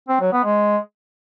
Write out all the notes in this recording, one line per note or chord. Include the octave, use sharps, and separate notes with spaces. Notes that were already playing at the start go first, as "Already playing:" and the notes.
C4
F#3
B3
G#3